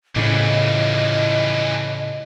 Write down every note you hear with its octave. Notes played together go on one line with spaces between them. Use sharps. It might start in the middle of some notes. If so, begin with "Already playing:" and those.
A2 C#3 E3 F3 D#5